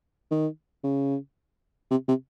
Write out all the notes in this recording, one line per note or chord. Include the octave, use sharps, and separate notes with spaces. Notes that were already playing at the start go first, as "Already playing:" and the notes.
D#3
C#3
C3
C3